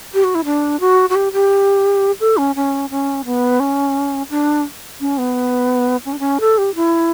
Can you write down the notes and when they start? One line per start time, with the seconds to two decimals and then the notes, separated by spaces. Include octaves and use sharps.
0.14 G4
0.24 F#4
0.35 E4
0.45 D4
0.80 F#4
1.10 F#4
1.15 G4
1.33 G4
2.20 A4
2.37 C#4
2.56 C#4
2.90 C#4
3.25 B3
3.60 C#4
4.30 D4
5.01 C#4
5.18 B3
6.05 C#4
6.13 D4
6.19 C#4
6.40 A4
6.58 G4
6.75 E4